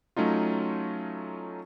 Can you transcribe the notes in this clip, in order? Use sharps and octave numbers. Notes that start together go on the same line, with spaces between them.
F#3 A3 C#4 D#4 F4